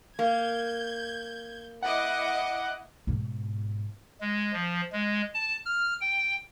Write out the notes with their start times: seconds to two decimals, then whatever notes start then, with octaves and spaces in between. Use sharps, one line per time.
0.19 A#3 G6 G#6
1.82 E4 D#5 F#5 D6
3.07 G#2 B2
4.21 G#3
4.53 F3
4.93 G#3
5.34 A5
5.65 F6
6.01 G5